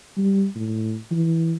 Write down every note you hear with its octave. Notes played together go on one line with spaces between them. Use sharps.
G3
A2
E3